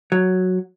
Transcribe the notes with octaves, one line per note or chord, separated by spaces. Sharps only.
F#3